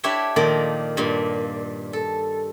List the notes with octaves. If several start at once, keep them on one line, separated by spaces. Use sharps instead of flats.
D4 E4 G4 C#5 E5 G5
A#2 D#3 F3 A#4 D5
G2 A#2
A4